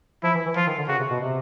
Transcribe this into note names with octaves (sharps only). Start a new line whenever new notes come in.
F3 E4
E3
E3
F3 F4
D#3
D3
C#3 F#4
C3
B2
C3